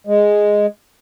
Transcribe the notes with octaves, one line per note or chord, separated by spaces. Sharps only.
G#3